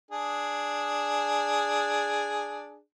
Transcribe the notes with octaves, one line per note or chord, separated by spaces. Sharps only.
D4 G#4